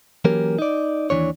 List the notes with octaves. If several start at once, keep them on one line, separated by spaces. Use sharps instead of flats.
E3 F#3 A#3 C#4 G4 A#4
D#4 D5
D#2 C#3 E3 D4 C#5